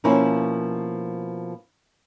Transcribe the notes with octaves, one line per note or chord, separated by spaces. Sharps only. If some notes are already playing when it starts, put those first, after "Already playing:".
B2 F3 A#3 C#4 E4